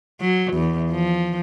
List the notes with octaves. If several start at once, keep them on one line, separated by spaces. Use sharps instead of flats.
F#3
E2
F3